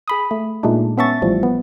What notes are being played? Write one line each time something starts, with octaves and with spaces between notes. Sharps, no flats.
G#4 B5 D#6
A3
A#2 G#3 A3 D4 D#4
B3 C#4 E5 A5 C#6 A6
A1 A2 F3 G3
B3